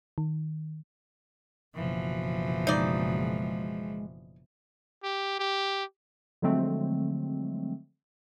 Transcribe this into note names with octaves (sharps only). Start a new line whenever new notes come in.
D#3
F#1 B2 E3 F3
G#3 D#4 D5
G4
G4
D3 F3 F#3 G#3 A3 C4